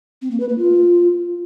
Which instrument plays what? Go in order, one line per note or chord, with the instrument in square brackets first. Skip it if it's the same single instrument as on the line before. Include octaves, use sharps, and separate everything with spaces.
[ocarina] C4
A#3
B4
A#3
F4